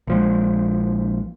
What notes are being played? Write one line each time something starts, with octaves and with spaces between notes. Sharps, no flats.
A#1 F3 G#3